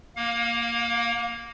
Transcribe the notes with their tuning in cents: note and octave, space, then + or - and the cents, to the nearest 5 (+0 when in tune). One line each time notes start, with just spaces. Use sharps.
A#3 +0 F5 +35